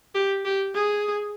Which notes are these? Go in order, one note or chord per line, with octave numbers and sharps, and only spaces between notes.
G4
G4
G#4